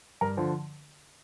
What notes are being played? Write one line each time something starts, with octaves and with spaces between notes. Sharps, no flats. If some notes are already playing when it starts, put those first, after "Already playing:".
G2 A#4
D3 F3